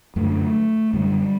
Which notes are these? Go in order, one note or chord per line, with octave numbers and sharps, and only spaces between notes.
F#2 D3 A3
F#2 D3 G3